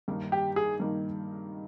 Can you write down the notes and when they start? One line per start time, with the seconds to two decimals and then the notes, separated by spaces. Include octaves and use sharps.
0.08 G2 D#3 A#3 D#4
0.32 G4
0.56 G#4
0.80 G2 D#3 A#3 D#4